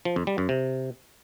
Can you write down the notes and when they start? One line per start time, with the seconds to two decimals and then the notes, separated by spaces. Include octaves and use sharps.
0.05 F3
0.16 F2
0.27 G3
0.38 F#2
0.49 C3